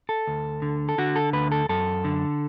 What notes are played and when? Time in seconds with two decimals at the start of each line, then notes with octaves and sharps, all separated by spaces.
0.09 A4
0.27 D2
0.62 D3
0.89 A4
0.98 D3 F#4
1.16 A4
1.33 D2 B4
1.52 A4
1.69 F#2 A4
2.05 D3